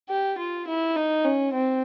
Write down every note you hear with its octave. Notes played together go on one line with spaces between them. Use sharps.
G4
F4
E4
D#4
C#4
C4